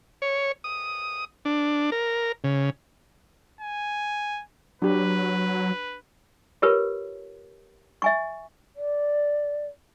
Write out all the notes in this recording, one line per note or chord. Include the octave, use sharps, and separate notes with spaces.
C#5
D#6
D4
A#4
C#3
G#5
F#3 D4 G4 B4
F4 G4 A#4 B4 C#5
E5 G#5 C#6
D5